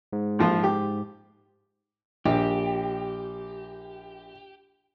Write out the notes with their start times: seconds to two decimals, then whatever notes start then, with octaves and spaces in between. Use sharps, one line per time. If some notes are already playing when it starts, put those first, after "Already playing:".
0.13 G#2
0.39 A#1 F3 F4
0.64 G4
2.26 A#1 G4